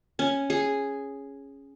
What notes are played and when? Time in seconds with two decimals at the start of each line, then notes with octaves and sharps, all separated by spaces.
0.19 C#4
0.50 G#4